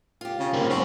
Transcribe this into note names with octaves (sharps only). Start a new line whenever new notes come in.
F4 G4
C#3
G#2 A#3 C4
C4 C#4 F#4